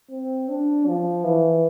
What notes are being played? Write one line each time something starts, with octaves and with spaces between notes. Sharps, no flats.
C4
D4
F3
E3